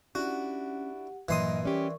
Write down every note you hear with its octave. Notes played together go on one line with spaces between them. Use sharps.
C#4 D4 E4 F#4 G4 F#5
G2 A#2 E3 F#3 A#4 D#5 C6 D#6
G3 C#4 G4 A#4 D5 C#6